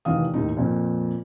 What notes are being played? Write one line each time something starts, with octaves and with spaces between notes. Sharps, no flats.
F1 D#3 E3 F5 D#6
D#2 A2 D#4
F2 A#2